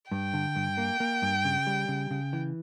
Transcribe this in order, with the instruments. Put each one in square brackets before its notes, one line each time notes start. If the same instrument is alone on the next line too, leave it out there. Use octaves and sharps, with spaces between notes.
[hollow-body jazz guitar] G2 [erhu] G5
[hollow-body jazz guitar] D3
G2
A#3
A#3
G2
C#3
G3
C#3
C#3
E3